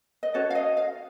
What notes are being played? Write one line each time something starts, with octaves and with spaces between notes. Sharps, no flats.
D#5
C#4 F#4 A4 C#5
F5
D#5
F5